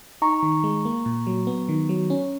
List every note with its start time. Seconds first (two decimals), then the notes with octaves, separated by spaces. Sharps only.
0.22 D#4 A#5 C#6
0.43 D#3
0.64 G#3
0.85 A#3
1.06 A#2
1.27 F#3
1.47 B3
1.69 D#3
1.89 F#3
2.10 C#4